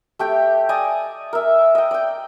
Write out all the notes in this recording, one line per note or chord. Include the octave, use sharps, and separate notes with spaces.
A3 G4 G5
D5 D#5 G#5 A5
A#4 E5
D#5 G5
D5 G5